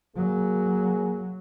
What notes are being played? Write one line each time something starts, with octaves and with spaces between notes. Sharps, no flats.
F#3 A#3 G#4